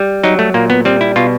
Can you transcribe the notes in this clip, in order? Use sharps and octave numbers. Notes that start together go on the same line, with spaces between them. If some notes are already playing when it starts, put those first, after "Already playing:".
Already playing: G3
F#3 D#4
A3
A#2 A#3
B3
G3 C4
E4
B2 F4